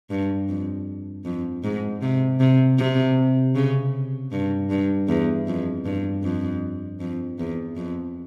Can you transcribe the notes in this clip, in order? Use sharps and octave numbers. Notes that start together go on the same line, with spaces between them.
G2
F2
F2
G#2
C3
C3
C3
C#3
G2
G2
E2
F2
G2
F2
F2
E2
F2